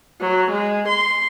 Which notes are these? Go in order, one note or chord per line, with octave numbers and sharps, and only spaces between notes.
F#3
G#3
C6